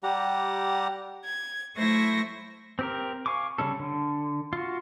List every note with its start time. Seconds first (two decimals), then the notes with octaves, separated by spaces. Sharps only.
0.03 G3 G4 F#5 A#5
1.23 G#6
1.76 F#3 A3 E4 C5 C#6 A#6
2.79 C4 G4 A#4
3.26 F5 G#5 C#6 D6
3.58 C#3 G3 C#4 A4
3.80 D3
4.53 F4 F#4